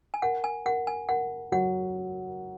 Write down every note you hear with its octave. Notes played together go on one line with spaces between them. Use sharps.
G#5
A#4 F#5
G#5
A#4 F#5
G#5
A#4 F#5
F#3 F#5